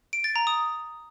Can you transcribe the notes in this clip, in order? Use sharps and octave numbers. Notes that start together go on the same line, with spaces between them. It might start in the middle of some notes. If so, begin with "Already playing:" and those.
D7
A6
A#5
D#6